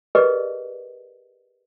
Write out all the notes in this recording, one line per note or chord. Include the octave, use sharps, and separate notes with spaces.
G4 G#4 A#4 B4 D5 D#5